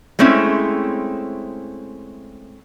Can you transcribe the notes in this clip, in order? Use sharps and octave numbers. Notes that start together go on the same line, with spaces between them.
G#3 A3 C4 C#4 E4